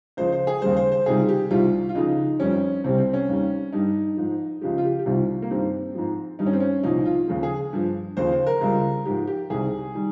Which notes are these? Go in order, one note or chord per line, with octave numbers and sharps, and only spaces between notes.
C#2 C#3 F3 C5
C5
G#4
D#2 C#3 G3 C5
C5
C5
C#2 C3 D#3 G3 G#4
G4
C2 C3 D#3 G3 F4
F4
C#2 C#3 F3 D#4
F2 D#3 G3 C#4
C2 C3 G3 C4
C4
C#4
D#2 D#3 G3
G2 G3 D#4
G#2 F3
C#2 C#3 F3 G4
F4
G4
G4
C2 C3 D#3 G3 F4
A#3
G2 D#3 G3 C4
G#2 F3
G2 D#3 G3 D#4
C#4
C4
C#4
C2 A#2 F3 D#4
F4
D#2 C#3 F3
G#4
G2 F3
D#2 C#3 F3 C5
C5
A#4
C#2 C#3 G3
G#2 F3 G4
G4
C2 C3 D#3 G3 G#4
D#3 G3